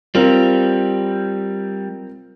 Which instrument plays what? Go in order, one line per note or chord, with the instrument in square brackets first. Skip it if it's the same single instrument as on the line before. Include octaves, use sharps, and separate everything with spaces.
[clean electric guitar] G3 [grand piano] C4 F4 A#4